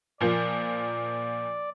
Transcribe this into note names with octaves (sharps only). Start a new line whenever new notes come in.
A#2 F3 A#3 D5